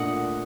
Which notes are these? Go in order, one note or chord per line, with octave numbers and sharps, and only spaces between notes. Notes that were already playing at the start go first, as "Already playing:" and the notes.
Already playing: A#2 A3 D4 D#5 F#5